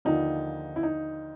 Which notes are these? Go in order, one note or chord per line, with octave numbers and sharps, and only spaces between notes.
D#2 D3 F3 D#4
E4
D#4